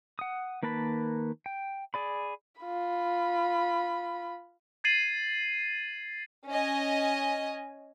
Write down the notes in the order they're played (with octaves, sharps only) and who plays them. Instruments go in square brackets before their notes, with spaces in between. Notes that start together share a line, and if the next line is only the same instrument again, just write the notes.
[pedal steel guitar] F#5 D#6
D#3 A#3 B4 A5 B5
G5
G#4 D5 B5
[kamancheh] F4 B5
[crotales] G#6 A6 C7 D#7 F#7
[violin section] C#4 D#5 G#5